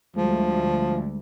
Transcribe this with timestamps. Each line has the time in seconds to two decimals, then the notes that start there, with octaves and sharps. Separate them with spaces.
0.17 D2 F3 G3 G#3